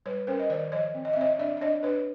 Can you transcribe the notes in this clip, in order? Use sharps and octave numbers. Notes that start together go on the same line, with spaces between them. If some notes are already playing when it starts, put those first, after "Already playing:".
G3 B4 C#5
C#4 A#4 C5
D#5
D#3 C5 D5
F3 C#5 D#5
C4
D#5
E5
C4 C#5 D#5
D4 D5 E5
D5
D4 C#5 D#5
D4 B4 C#5